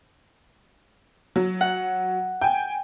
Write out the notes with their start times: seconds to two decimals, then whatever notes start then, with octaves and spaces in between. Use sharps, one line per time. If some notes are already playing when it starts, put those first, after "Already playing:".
1.36 F#3
1.61 F#5
2.41 G5 G#5